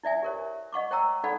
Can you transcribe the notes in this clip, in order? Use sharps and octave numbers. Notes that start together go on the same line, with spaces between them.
E4 D5 E5 G#5
G4 A#4 C#5
D#5 F#5 C#6 D6
C#5 G5 A#5 E6
D#4 A4 D5 F#5 B5